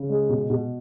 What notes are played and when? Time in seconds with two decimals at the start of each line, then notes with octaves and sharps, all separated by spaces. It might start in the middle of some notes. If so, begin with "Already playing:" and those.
Already playing: C#3
0.09 G#3
0.29 B2
0.50 B2